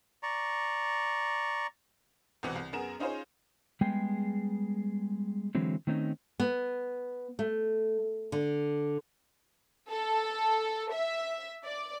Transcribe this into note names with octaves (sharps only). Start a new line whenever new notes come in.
D5 A#5 C#6
C2 B2 E3 C4 F#5
C2
F#2 B3 G#4 A#4 E7
C#4 D#4 F4 G#4 C5 C#5
G3 G#3 B3 G#4 G5
D3 E3 F#3 G#3 C4
D#3 A3 C4 C#4 D#4
B3
A3
D3
A4
E5
D5